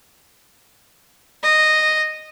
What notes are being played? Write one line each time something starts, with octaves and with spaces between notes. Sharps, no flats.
D#5